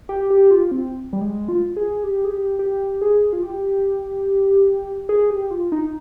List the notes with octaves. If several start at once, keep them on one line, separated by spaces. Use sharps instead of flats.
G4
G4
F4
C4
G3
G#3
F4
G#4
G4
G#4
G4
G4
G#4
F4
G4
G#4
G4
F4
D#4